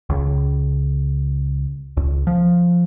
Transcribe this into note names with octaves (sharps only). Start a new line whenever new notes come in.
C#2
C#2
F3